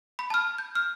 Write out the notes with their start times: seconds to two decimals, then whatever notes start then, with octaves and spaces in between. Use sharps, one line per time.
0.19 B5
0.30 A5 F6
0.58 G6
0.75 F6